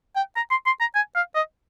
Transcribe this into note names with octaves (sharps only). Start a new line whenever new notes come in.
G5
A#5
C6
C6
A#5
G#5
F5
D#5